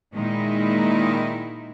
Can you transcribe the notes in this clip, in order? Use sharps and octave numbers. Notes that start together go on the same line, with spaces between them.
A#2 D#3 G#3 D#4 E4